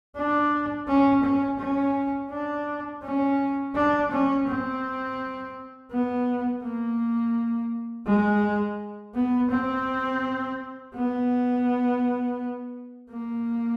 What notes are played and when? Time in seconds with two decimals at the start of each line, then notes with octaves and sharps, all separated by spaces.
0.16 D4
0.87 C#4
1.23 C#4
1.59 C#4
2.31 D4
3.03 C#4
3.75 D4
4.11 C#4
4.48 C4
5.91 B3
6.63 A#3
8.06 G#3
9.15 B3
9.50 C4
10.95 B3
13.10 A#3